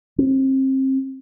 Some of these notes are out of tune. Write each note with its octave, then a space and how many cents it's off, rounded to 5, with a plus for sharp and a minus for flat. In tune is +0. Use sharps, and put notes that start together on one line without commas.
C4 +30